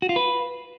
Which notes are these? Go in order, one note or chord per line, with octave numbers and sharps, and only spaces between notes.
F#4
F4
B4